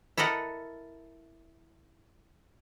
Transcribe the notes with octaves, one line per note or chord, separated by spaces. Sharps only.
E4 A4 A#4 D#5 F#5